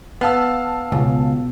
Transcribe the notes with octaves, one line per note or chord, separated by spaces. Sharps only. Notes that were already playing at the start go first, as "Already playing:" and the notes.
B3 F5 A5 E6
C#2 B2